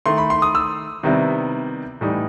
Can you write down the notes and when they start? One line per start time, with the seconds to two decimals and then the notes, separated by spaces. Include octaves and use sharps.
0.06 D#3 A3 E4 C6
0.18 B5
0.30 C6
0.42 D#6
0.55 E6
1.03 C3 D#3 G3 B3 E4
2.01 A2 E3 G3 D#4